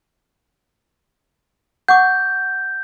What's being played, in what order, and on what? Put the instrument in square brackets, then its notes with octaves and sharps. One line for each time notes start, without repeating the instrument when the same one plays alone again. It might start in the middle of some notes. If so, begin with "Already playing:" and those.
[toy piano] F#5 C#6 D6 [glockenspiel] G6